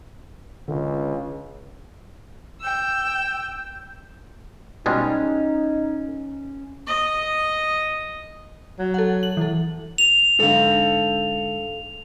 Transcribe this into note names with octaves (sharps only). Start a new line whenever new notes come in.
C#2 D3
G5 E6
B2 G3 G#3 C#4 D#4
D#5
F#3
A4 F#5
F#7
E3 A4
F7
G#2 D3 A4 F5